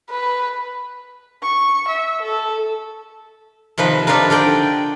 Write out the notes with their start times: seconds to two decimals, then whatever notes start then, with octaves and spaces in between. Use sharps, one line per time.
0.10 B4
1.43 C#6
1.88 E5
2.21 A4
3.78 C3 D#3 F3 B4
4.07 D4 D#4 F4 A#4 B4
4.30 D3 A#4 D5 G5